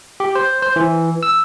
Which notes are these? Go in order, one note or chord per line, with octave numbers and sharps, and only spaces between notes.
G4
C5
C5
E3
E6